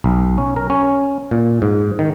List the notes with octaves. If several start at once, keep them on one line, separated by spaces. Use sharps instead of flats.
B1
C#4
A#4
C#4
A#2
G#2
D#3